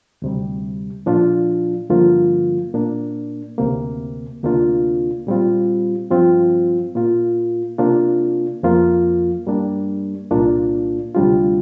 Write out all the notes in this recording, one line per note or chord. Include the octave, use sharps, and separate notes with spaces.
D2 C3 G3
A#2 F3 D4 F4
G2 D3 F3 A#3 F4
A#2 A#3 D4
D2 C3 A#3
D2 C3 A#3 D4 F4
A#2 G3 C4 F4
G2 F3 C4 F4
A#2 A#3 F4
C3 A#3 D4 F4
F2 F3 A#3 F4
G2 G3 A#3 D4
C2 A#2 A#3 D4 F4
D2 C3 G3 D4 F4